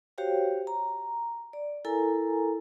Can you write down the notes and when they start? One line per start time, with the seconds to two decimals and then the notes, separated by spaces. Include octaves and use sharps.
0.18 F#4 G4 C5 C#5 F5 G5
0.67 A#5
1.53 D5
1.85 E4 A4 A#4 G#5 A#5